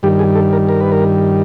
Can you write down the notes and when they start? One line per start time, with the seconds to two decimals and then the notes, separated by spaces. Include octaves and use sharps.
0.03 G2 D#3 G3 G4
0.19 G#4
0.35 A4
0.53 A#4
0.69 A#4
0.81 B4
0.92 A#4